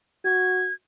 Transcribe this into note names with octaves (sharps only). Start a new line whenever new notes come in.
F#4 G#6